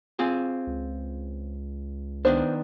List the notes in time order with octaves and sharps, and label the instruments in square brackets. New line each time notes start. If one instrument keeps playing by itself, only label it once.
[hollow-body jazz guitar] C4 F4 G#4
[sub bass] C#2
[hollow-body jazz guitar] D#3 B3 D4 [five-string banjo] C5